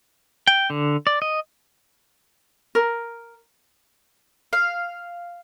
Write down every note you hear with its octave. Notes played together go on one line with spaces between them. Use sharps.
G5
D3
D5
D#5
A#4
F5